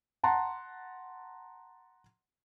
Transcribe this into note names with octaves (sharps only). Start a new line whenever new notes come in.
F#5 A5 A#5 C6